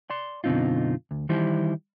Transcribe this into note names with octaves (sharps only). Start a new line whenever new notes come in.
D5 C6
F#2 B2 D3 C4 D#4 F4
D2
D#3 E3 G3 E4 C5